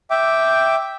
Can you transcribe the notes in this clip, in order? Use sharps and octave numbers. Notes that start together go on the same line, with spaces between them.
E5 G5 D6